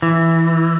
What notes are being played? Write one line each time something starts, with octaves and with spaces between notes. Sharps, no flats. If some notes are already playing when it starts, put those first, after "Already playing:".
E3